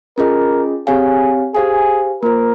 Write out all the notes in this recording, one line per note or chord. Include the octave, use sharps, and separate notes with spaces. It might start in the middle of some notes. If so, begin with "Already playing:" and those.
C#4 F4 G#4 A#4 D#5
C4 G4 G#4 C#5 F5 G#5
G4 G#4 C5 F5 G#5
A#3 F4 A#4 C5